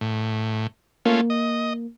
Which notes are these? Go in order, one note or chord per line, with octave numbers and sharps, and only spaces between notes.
A2
A3 A#3 C#4 F4
D#5